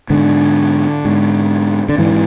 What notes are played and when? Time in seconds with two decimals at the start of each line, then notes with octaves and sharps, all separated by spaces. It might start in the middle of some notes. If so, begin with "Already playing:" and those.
0.10 G#2 D3
1.05 G#2
1.89 D3
1.98 G#2 E3